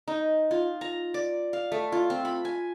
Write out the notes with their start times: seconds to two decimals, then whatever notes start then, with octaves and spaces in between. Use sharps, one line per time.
0.08 D#4
0.51 F4
0.81 A#5
1.14 D5
1.53 F5
1.72 A3
1.92 F4
2.10 C4
2.25 B5
2.45 G#5